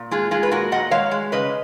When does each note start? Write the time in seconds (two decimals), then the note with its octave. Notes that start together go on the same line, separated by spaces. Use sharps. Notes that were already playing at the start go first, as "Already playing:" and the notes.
Already playing: A#2
0.11 G#3 F4 G#4
0.31 G#3 F4 G#4
0.43 B4
0.51 A#2 F#4 A#4
0.72 A#2 D#5 F#5
0.91 G#3 C#5 F5
1.11 G#3
1.32 C#3 B4 D#5